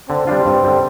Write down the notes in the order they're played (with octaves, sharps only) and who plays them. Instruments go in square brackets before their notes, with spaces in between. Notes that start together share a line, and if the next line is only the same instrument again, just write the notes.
[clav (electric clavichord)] D3 [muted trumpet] C4
[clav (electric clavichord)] G3 D4 F4
G2
D3 G3